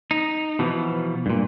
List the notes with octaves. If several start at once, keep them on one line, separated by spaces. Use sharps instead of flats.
D#4
B2 E3 F3
G2 A#2